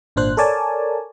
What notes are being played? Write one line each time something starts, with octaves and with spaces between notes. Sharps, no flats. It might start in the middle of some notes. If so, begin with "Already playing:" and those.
G#1 A#2 D4 C5 F#6
A4 A#4 C#5 D5 G#5 A5